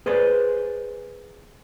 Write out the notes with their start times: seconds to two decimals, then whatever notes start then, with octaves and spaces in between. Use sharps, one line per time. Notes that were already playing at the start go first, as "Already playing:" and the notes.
0.06 G#4 B4 C5 D5